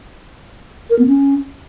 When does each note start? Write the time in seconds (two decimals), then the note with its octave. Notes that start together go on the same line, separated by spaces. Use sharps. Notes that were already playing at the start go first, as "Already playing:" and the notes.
0.90 A#4
0.99 B3
1.07 C#4